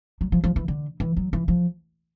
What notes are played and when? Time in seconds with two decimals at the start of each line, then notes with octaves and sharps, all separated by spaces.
0.21 F#3
0.32 F3
0.44 F3
0.56 E3
0.68 D3
1.00 E3
1.17 F#3
1.33 E3
1.48 F3